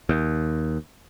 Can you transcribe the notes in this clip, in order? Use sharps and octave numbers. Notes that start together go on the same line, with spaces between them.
D#2